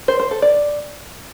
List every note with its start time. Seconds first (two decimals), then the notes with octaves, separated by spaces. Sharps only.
0.08 C5
0.20 C5
0.31 A4
0.42 D5